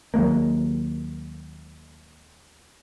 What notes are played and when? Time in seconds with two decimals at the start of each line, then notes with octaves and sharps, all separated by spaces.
0.14 D#2 F#3 G#3 A#3